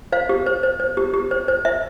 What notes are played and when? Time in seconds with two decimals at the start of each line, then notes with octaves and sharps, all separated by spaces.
0.12 C5 F5
0.29 G4
0.46 C5
0.63 C5
0.80 C5
0.97 G4
1.14 G4
1.31 C5
1.48 C5
1.65 C5 E5